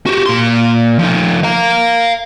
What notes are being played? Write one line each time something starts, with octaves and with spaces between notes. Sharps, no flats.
F#4 G4
A#2 C6
F3 D#4
F5 A#5